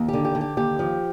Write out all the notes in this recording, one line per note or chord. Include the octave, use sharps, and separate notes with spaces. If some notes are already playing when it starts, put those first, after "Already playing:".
Already playing: D#2
D3 G4
G4
D3
G4
D#2 G4
F3